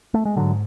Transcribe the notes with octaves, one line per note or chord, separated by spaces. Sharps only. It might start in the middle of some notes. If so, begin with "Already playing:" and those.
A3
G#3
G#2 D3 F#3